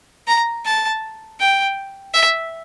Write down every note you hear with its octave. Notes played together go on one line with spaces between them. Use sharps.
A#5
A5
G5
E5